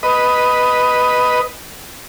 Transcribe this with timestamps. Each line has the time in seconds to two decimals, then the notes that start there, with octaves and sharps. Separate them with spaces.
0.03 B4 D#5